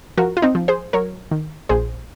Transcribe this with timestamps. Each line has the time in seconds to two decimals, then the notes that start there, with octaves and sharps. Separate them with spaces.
0.18 F3 F#4 A#4
0.37 F4
0.42 C4 D#4
0.55 F3
0.68 G#4 C5
0.93 F#3 A#4 C#5
1.31 D#3
1.69 A#1 G#4 C5